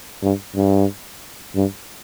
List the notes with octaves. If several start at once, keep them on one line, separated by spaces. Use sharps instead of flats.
G2
G2
G2